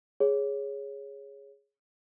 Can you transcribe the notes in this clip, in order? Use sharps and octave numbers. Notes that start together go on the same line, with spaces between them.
G#4 C#5